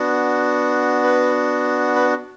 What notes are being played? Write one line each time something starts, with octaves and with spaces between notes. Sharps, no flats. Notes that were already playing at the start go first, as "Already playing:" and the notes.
Already playing: B3 D4 F#4
B4
B4